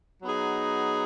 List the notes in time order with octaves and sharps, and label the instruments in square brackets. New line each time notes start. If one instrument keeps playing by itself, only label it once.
[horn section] F#3 B3 D#4 G#4